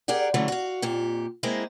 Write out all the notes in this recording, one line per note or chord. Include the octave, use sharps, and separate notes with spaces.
G4 G#4 A#4 D5 F#5
D3 E3 F#3 A3 C#4
F#4 F5
F2 A#2 G4
G#3 A#3 C4 E4